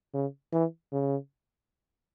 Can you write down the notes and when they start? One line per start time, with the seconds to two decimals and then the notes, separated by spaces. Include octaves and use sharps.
0.14 C#3
0.53 E3
0.92 C#3